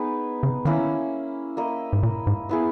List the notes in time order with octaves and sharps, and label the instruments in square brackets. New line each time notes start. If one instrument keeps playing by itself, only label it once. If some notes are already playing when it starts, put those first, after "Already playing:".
Already playing: [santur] B3 D#4 G#4 B4
[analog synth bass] C#3
[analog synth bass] D#3 [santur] A#3 C#4 E4
[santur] A#3 E4 A#4 D#5
[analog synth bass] G#2
A#2
G#2
[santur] B3 E4 G#4